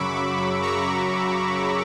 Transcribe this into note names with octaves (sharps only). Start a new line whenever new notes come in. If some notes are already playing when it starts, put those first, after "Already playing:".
Already playing: F#2 C#3 F#3 B5 C#6 D6 E6
A#5 C#6